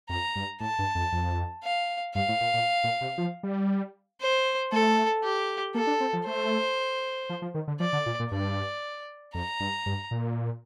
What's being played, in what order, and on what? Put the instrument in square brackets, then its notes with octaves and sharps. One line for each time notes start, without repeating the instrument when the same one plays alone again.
[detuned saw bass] F2 [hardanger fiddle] A#5
[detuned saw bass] G2
[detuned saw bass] A2 [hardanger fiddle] A5
[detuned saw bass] G2
F2
F2
[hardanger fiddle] F5
[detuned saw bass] G2 [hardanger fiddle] F5
[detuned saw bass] A2
A#2
A#2
A#2
C3
F3
G3
[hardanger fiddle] C5
[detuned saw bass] A3 [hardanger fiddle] A4
[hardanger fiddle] G4
[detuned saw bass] A#3 [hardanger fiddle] A4
[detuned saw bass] D4
C4
F3
[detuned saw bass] A3 [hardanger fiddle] C5
[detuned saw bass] F3
F3
D#3
D3
[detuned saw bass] F3 [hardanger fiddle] D5
[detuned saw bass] D3
A#2
A#2
[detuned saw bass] G2 [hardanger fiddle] D5
[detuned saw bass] F2 [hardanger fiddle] A#5
[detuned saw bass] G2
G2
A#2